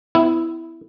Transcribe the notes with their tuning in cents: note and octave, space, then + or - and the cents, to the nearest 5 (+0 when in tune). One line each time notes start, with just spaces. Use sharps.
B3 +35 E4 +0